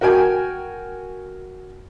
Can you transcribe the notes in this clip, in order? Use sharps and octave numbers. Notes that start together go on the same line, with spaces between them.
F#4 A#4 G5 G#5